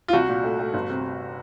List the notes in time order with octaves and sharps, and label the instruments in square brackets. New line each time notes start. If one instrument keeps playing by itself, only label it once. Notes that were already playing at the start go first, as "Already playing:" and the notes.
[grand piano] F4
[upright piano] C2 [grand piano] F#4
[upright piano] A#2
A3
A3
G1
C3